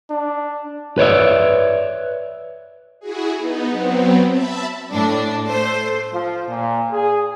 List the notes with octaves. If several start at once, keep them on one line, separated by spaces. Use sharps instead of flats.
D4
B4 C#5 D5 E5
E4 F#4 G#4
B3 D#4
F#3 B3 C4
E5 A5 B5
A2 D4
A3 C5
F3
A#2
G#4